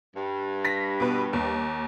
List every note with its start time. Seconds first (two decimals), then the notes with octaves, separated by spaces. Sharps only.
0.16 G2
0.65 A#6 B6
1.00 B2 B4
1.33 D#2